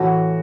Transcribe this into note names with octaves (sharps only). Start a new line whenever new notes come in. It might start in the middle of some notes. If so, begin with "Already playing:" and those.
Already playing: A2 E3 A3 F#4